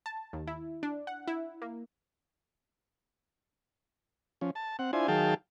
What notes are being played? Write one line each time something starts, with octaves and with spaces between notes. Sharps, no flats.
A5
D#2
E4
D4
F#5
E4
A#3
F3 C#4
A5
C4 F#5
D4 E4 F4 C5 G#5
D#3 F#3 G#4 F5 G5 A5